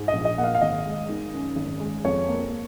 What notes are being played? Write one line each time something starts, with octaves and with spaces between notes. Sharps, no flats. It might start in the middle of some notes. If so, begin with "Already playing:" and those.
Already playing: G#2
D#5
A#1
D#5
A#3 F#5
F5
F5
G#1 D#5
G#3
D#3
F#2
G#1
G#3
F2 C#5
A#3